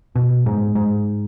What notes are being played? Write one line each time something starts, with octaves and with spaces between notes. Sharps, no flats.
B2
G#2
G#2